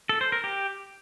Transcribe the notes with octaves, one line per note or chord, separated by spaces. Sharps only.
A4
C5
A#4
G4